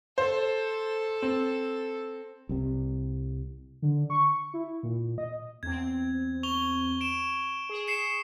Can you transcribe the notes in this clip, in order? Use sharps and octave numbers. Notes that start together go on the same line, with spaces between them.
A4 C5
C4
C2 C3
D3
C#6
E4
A#2
D#5
E2 C4 G#6
C#6 F7 G7
D7 E7
G#4
C7 C#7 E7